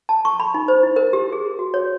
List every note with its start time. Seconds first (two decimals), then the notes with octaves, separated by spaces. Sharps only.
0.09 A5
0.25 C#6
0.40 B5
0.54 D#4
0.68 C5
0.83 E4
0.96 A#4
1.13 G4
1.32 G#4
1.59 F#4
1.74 C#5